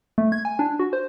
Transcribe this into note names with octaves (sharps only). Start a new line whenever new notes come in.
A3
G#6
G#5
D4
F#4
C5